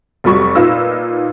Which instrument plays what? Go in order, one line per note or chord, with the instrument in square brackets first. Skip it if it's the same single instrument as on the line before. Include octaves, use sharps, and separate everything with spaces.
[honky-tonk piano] F1 F#3 G3 C#6
A#2 D#4 F4 B4 E6 A#6